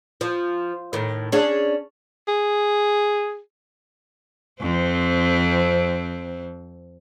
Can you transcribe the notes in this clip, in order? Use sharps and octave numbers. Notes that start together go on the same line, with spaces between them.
F3
A2 D#3
C#4 D4 G#4
G#4
F2 C4